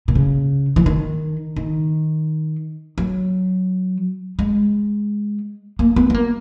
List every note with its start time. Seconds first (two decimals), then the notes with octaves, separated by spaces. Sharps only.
0.08 B2
0.15 C#3
0.76 E3
0.86 D#3
1.56 D#3
2.98 F#3
4.39 G#3
5.79 A#3
5.96 B3
6.10 B3
6.14 A#3